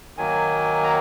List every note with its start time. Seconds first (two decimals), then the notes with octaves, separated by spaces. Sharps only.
0.17 D#3 F#3 A#3 G#5
0.83 A#5